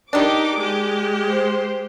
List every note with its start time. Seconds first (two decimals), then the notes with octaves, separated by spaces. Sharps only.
0.13 D#3 D4 D#4 G4 D6
0.58 G#3 G4
1.28 C5